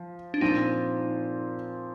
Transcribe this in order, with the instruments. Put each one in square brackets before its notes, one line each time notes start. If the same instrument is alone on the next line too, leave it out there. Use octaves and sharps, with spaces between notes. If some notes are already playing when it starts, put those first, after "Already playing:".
Already playing: [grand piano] F3
[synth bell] D4
[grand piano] A#2 F3 C4 [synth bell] D#4